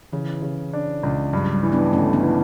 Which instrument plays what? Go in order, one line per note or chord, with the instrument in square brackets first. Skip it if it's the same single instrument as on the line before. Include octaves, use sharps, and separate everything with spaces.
[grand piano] C#3 [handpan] E3
[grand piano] C#3
D4
C#2
[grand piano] G2 [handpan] F#3
[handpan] G3
[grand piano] E3
[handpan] B3 D4
[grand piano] G1 [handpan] A3 C#4
[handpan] B3 D4
[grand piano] E3